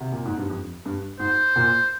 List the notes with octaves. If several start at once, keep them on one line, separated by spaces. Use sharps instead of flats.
C3
A#2
G#2
G2
F2
G2
G#2 C5
A#2